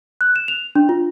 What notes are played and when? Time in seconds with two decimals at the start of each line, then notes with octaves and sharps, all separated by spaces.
0.21 F#6
0.36 E7
0.48 F7
0.76 D4
0.89 F4